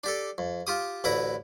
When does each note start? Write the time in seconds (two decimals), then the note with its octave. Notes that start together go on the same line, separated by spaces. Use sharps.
0.04 D4 G4 A4
0.38 F2
0.67 F4 G4 D#6
1.04 A1 D2 E4 B4 A#5